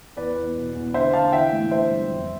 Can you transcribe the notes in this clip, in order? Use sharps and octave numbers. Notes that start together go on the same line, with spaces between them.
E2 B4 D5
E2
B2
E2
D3 C5 E5
D3 F5 A5
E3 E5 G5
A2
D3 C5 E5
G2
F2